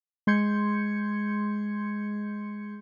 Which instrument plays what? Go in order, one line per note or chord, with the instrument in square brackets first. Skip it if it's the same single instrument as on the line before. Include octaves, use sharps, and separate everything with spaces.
[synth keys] G#3 C6 G6 G#6 C#7